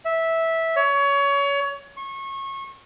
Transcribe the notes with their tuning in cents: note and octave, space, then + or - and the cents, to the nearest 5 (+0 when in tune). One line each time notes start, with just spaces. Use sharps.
E5 -10
C#5 +25
C#6 -30